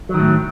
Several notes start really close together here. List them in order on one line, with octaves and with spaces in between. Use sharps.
F#3 D#3 A2